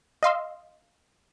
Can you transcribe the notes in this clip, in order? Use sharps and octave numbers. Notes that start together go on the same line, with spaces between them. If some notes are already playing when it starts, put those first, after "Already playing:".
D#5 F5 C6 E6